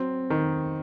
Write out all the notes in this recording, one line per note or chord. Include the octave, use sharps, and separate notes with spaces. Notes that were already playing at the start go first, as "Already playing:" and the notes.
Already playing: F#3 C4
D#3